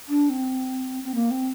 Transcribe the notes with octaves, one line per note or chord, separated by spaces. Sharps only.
D4
C4
C4
A#3
C4